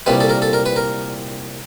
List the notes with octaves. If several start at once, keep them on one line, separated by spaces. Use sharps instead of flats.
C2 A#2 G3 B4
A4
A#4
A4
A#4
B4
A#4